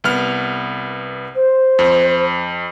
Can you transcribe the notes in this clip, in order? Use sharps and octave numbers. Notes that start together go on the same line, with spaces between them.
C2 B3 F6
C5
F2